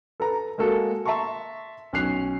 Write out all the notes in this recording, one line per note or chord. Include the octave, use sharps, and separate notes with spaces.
A4 B4 A#5
G#3 A#3 F#4 A4
E5 A5 A#5 C6 C#6
B1 C#4 F#6 C7 F7